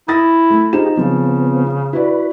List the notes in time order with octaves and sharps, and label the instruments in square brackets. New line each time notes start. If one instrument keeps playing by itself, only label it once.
[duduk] E4 [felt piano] D#6 A6 A#6
[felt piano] A3
[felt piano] D#4 C5 E7 [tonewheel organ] F4 G4 G#4
[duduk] C#3 [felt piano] F3 [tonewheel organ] B3 C4
[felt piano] E4 F#4 D5 [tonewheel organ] B4